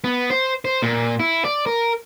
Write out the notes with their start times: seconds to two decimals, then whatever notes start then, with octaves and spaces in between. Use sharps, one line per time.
0.04 B3
0.30 C5
0.65 C5
0.82 A#2
1.20 E4
1.45 D5
1.66 A#4